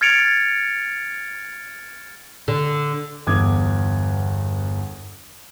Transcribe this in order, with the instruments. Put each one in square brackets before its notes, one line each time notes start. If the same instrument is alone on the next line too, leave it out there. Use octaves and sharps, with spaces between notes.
[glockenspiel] F6 G#6 A6 C#7 D7 F7
[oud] D3
[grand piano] G1 E2 D6 D#6 G#6